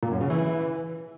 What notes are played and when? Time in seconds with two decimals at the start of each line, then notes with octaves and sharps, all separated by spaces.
0.03 A#2
0.12 F#2
0.21 C#3
0.30 E3